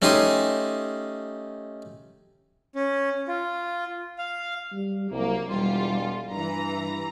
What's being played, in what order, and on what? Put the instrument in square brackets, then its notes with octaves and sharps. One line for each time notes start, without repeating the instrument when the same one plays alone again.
[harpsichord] A3 C#4 D#4 G4 C6 D#6
[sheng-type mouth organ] C#4
F4
F5
[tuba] G3
[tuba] C2 [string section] F#3 A#3
[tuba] E1 [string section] G3 F4
[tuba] G2 [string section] E3 A#5